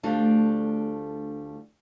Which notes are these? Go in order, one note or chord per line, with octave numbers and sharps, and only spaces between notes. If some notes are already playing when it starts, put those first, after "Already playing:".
D2 G3 A3 D4 F4 A4